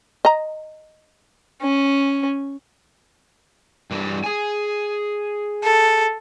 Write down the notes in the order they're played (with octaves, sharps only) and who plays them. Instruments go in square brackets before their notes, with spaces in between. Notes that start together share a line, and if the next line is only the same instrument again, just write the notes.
[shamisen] D#5 A#5
[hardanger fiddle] C#4
[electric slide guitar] G2 E3 G3
G#4 G#5
[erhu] A4